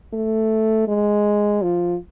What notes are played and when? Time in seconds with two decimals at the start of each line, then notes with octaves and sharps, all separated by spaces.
0.13 A3
0.88 G#3
1.62 F3